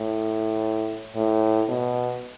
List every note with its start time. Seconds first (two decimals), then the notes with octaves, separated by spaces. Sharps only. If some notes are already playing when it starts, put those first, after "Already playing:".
Already playing: A2
1.16 A2
1.69 B2